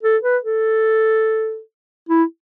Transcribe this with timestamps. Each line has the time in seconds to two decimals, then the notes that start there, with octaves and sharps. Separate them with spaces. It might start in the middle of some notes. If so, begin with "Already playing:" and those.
0.03 A4
0.23 B4
0.44 A4
2.09 E4